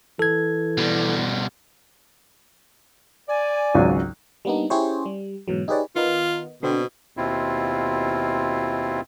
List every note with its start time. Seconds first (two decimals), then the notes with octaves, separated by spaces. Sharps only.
0.19 E3 A4 G#6
0.77 B2 G3
3.29 D5 G#5
3.75 G#1 C#2 F#3
4.45 G3 A#3 B3 D4 D#4
4.70 C#4 E4 G4 G#4 C5 C#5
5.06 G3
5.48 G#2 B2 E3 F#3
5.68 D#4 G4 G#4 B4 C#5 D5
5.96 D#3 B3 D#4 F4
6.63 B2 D3 C4
7.17 D#2 B2 C4 E4 F4